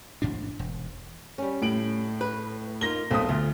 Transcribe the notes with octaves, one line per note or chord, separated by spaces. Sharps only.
A1 G#2 B2 D4
E1
G3 C#4
A2 D7 F#7
B4
A#3 D#4 F4 A#6 G7
B1 A3 C4 D#6
D2 A3 F4